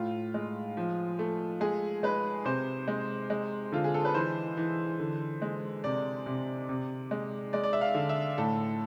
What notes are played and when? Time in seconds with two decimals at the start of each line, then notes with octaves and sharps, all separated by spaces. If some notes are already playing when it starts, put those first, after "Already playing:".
Already playing: A2 F4
0.34 G#3
0.77 F3
1.19 A3
1.61 G#3 G#4
2.03 G#3 B4
2.45 C3 C5
2.88 G#3
3.30 G#3
3.72 D3 F4
3.84 G#4
3.94 A4
4.05 B4
4.14 E3 C5
4.57 E3
4.99 D3
5.42 G#3
5.84 C3 D5
6.26 C3
6.69 C3
7.11 G#3
7.53 G#3 D5
7.64 D5
7.73 E5
7.81 F5
7.95 D3
8.09 E5
8.38 A2 A4